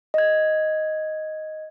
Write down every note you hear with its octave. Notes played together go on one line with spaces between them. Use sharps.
D#5 G#6